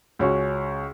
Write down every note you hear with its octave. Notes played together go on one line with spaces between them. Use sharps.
C#2 C#4 F#4